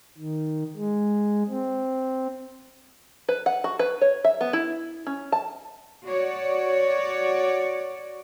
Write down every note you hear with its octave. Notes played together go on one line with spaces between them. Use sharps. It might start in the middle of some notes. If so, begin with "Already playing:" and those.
D#3
G#3
C4
B4
F#5
F#4
B4
C#5
E5
B3
E4
C#4
A5
F#4 C#5 D5